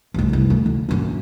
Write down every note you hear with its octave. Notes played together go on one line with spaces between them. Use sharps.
F1 C2
F1 C2
D2
D2
A#1 F#2